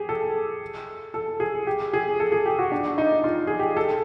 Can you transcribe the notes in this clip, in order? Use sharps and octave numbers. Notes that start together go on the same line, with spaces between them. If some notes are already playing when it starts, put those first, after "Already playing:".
Already playing: G4 G#4
A4
A4
G#4
G4
G#4
A4
G#4
G4
F#4
D4
D#4
F4
G#4
G4
A4